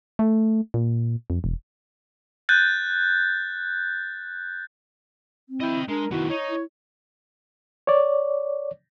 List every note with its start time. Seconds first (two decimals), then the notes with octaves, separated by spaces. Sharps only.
0.19 A3
0.74 A#2
1.30 F2
1.44 E1
2.49 F#6 G6 A6
5.49 C4
5.61 E4 D#5 G5
5.89 G#3 D4 A#4
6.11 D#3 B3 E4 F#4
6.30 D#4 C#5
6.50 E4
7.87 C#5 D5